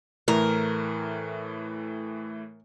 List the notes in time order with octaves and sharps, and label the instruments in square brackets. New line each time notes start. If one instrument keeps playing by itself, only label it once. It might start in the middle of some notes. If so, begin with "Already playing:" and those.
[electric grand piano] A2 E3 A3 [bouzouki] A#4